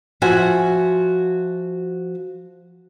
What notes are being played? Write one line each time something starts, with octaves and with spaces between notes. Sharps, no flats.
F3 F#4 E5 G#5